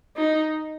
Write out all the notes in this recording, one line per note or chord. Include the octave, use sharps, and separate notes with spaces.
D#4